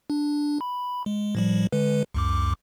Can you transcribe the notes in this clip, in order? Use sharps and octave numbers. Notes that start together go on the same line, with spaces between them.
D4
B5
G#3
A2 F3 G3
D3 G#3 B4
C#2 F#2 D6